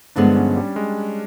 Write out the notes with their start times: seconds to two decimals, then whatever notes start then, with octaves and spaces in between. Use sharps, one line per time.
0.16 G2 D3 F3 G#3 B3 D4
0.36 C#4
0.56 G3
0.76 G#3